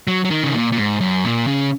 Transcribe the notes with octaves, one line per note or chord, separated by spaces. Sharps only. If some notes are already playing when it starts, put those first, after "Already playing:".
F#3
F#3
D#3
C#3
A#2
A#2
G#2
F#2
A#2
C#3